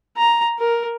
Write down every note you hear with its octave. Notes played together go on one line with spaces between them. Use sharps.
A#5
A#4